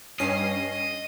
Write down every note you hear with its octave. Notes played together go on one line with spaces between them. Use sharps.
G2 C#4 D#5 C7